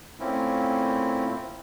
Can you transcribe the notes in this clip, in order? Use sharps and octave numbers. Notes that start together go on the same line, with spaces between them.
A#2 A3 A#3 C4 C#4 E4